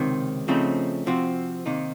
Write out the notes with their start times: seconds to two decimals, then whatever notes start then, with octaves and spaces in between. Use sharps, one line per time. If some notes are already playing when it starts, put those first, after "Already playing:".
Already playing: C#2 C3 D#3
0.48 C#3 F3 A3 C4 D#4
1.06 C3 F3 C4 F#4
1.66 C3 D#3 A#3 D#4